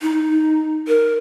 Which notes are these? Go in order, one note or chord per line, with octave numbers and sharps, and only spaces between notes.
D#4
A#4